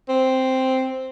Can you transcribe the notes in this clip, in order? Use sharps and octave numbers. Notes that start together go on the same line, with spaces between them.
C4